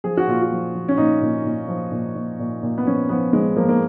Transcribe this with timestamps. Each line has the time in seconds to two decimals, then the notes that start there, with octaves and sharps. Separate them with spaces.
0.04 F3 G#4
0.17 F#4
0.27 A#2 F4
0.42 F#4
0.51 F3
0.75 F3
0.88 C#4
0.98 A#2 D#4
1.22 A#2
1.45 A#2
1.68 F3
1.92 A#2
2.15 A#2
2.39 A#2
2.63 A#2
2.78 B3
2.87 F3 C#4
3.09 F3 B3
3.33 F3 G#3
3.56 F3 A#3
3.69 A#3